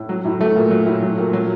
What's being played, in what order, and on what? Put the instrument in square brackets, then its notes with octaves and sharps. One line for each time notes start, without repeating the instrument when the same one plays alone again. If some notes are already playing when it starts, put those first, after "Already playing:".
Already playing: [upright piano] A2
F#3
A2
F#3 A3
A#2
F#3
A2
F#3
A#2
F#3